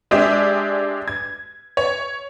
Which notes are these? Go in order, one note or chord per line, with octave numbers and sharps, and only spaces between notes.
G#3 D4 G4 E5
G#6
C#5